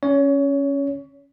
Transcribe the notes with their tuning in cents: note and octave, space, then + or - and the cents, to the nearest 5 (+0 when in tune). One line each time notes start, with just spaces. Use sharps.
C#4 +0 C#5 +25